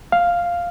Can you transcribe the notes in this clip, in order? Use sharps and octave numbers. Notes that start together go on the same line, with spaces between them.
F5